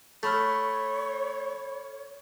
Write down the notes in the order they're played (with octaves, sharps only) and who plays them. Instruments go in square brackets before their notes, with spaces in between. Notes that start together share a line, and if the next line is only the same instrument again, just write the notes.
[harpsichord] A3 [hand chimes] A4 B5 F6 [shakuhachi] C#5